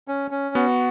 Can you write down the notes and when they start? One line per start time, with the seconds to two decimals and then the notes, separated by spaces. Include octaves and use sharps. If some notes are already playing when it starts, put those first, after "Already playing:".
0.08 C#4
0.31 C#4
0.55 B3 F#4